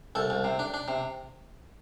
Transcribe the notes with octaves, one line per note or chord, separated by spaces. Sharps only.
C2 A4
C2
C3
D4
D4
C3